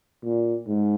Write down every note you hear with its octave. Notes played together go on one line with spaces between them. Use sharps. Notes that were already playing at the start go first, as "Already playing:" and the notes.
A#2
G#2